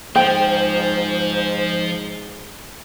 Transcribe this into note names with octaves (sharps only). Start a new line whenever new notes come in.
G#2 F3 C5 G5